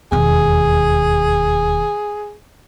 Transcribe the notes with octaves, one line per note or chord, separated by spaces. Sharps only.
E1 D#2 G#4